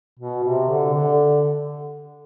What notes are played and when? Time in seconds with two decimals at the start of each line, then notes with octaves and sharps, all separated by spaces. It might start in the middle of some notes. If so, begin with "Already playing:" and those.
0.19 B2
0.43 C3
0.68 D3
0.93 D3